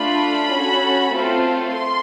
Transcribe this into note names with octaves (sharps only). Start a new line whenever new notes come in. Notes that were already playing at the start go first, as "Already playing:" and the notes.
Already playing: A3 D4 F4 B5
C#4 F#4 A4
A3 C4 F4 A4
C6